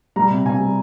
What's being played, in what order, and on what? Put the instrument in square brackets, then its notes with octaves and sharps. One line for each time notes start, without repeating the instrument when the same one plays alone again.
[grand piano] G3 A#5
C3
C3 G#5
G3